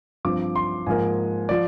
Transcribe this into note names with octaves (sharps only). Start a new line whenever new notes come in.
G2 F3 C4 D6
C6
G#2 F3 A#3 G#5
F3 D5